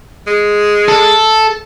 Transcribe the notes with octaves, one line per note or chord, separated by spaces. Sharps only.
G#3
A4